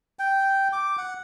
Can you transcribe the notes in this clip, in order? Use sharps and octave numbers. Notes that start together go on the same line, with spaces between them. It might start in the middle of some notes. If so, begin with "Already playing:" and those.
G5
D6
F#5